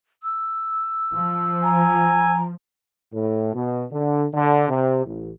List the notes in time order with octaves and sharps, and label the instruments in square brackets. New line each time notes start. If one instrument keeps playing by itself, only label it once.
[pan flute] E6
[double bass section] F3
[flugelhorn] G#5 [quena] A#5
[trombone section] A2
B2
D3
D3
C3
A1